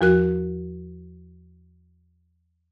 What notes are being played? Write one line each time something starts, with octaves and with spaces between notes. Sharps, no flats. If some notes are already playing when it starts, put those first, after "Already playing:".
E2 F3 F#4 A#4 F#6